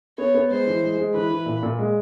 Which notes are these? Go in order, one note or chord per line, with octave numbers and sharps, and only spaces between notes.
B3 C#5
B3
G#3 C5
E3
G#3
G#3
E3 B4
E3
A#2
A#2
G#3